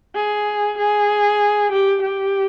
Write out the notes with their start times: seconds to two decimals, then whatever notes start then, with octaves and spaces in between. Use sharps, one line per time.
0.15 G#4
0.78 G#4
1.72 G4
2.02 G4